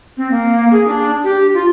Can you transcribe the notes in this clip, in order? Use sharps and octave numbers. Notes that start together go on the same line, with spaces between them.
C4
A#3
G#4
D4
G4
F4